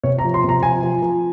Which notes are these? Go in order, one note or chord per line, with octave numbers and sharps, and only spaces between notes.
C3 C#5
A#5
F3
C6
C3 A#5
F3 G#5
F3
F3